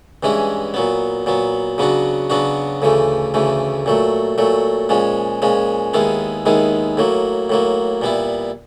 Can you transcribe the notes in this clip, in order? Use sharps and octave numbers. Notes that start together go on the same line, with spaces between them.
G2 E3 G#3 C#4 E4
A#2 F#3 B3
A#2 F#3 B3
C#3 F#3 B3 D4 F#4
C#3 F#3 B3 D4 F#4
D2 C#3 E3 A3
D2 C#3 E3 A3
A#2 F#3 A3
A#2 F#3 A3
A#2 F3 G#3 C#4
A#2 F3 G#3 C#4
D#2 D#3 G#3 B3 E4
D#2 D#3 G#3 B3 E4
A2 F#3 A#3
A2 F#3 A#3
A#2 G3 B3 E4